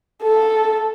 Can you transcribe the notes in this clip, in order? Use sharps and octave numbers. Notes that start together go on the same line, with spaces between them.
A4